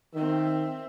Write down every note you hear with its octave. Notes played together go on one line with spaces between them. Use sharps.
D#3 C4 E5